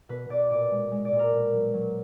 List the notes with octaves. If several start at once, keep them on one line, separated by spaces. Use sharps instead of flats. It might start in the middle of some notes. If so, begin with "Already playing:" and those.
B2 B4
B2 D5
A#2 D5
G#3
G#3
D5
A#2
A#4
B2
F#3
F#3